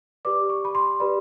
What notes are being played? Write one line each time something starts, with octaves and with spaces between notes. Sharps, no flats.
G4 B4 D5 D6
C#6
B5
C6
G4 B4 D5 B5